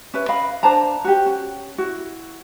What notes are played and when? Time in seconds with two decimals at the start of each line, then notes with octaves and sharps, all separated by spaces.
0.14 C#4 B4 E5
0.29 A#4 D#5 F5 B5
0.63 D4 C5 A5 A#5
1.04 F#4 G4
1.26 C#4
1.78 E4 F#4